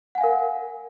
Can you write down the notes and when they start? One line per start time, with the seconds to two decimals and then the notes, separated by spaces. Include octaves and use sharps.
0.15 F#5
0.18 G#5
0.21 F5
0.24 A#4